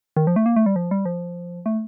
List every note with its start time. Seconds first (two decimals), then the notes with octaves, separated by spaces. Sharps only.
0.17 D#3
0.27 F3
0.36 A3
0.46 A#3
0.56 A3
0.66 G3
0.76 F3
0.91 G3
1.05 F3
1.66 A3